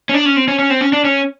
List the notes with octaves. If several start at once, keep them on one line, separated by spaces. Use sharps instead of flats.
C#4
D4
C#4
C4
C#4
C#4
C4
C#4
D4
C#4